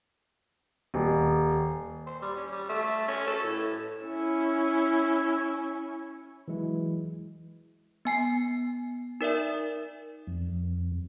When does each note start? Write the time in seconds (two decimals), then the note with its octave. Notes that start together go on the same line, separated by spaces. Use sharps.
0.94 D#1
2.07 C5
2.22 G3
2.37 C#4
2.52 G3
2.69 A3
3.08 C#4
3.27 A4
3.44 A2
4.05 C#4 E4
6.48 E3 F#3 G#3 E4
8.05 B3 G#5 C7
9.21 D#4 A#4 D5 E5
10.27 F2